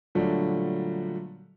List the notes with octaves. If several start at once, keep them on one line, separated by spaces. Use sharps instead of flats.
A#2 D3 F#3 G3 A3